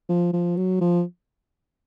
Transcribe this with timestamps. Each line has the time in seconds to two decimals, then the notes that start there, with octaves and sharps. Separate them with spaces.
0.09 F3
0.33 F3
0.57 F#3
0.81 F3